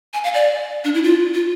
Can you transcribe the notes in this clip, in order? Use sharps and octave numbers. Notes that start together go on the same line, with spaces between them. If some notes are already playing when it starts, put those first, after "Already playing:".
G#5
F5
D5
D4
E4
F4
F4